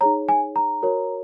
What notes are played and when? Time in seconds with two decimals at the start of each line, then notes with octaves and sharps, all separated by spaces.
0.01 D#4 G#4 C#5 A#5
0.29 G#5
0.56 A#5
0.82 F#4 A#4 C#5